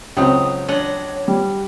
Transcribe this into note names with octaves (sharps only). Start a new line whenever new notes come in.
C#2 F#3 C4 D#6
D4 C#5 D#5 F#5
G3